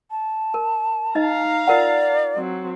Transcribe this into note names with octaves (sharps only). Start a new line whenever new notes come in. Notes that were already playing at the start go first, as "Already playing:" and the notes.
A5
A#4
D#4 D#5 F5 A#5
F4 A#4 D5 F#5
F#3 C4